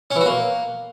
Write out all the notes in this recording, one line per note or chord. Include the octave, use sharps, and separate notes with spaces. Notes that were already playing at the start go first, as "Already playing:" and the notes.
C#4
E3
F#4
A#3